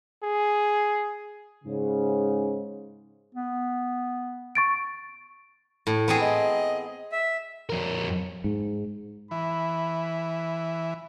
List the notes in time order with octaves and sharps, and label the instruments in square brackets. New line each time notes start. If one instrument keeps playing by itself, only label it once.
[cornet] G#4
[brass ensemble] G#2 C#3
[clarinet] B3
[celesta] C#6 A6 D7
[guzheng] A2
B3 C4 G#4
[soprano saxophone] D#5
[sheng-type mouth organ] E5
[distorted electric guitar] F2 A#4
[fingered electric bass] G#2
[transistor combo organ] E3 [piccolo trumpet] B5